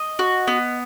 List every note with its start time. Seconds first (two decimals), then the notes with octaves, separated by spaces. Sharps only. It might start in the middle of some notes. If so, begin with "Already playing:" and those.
Already playing: D#5
0.19 F#4
0.47 B3